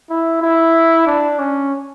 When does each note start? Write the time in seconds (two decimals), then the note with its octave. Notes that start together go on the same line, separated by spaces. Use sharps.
0.10 E4
0.42 E4
1.07 D4
1.39 C#4